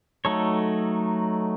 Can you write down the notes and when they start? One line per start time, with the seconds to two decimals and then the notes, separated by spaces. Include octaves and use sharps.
0.25 F#3 A3 D#4 A4 C#5